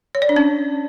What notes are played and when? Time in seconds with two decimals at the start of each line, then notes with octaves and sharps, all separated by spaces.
0.15 C#5
0.22 D5
0.29 D4
0.36 C#4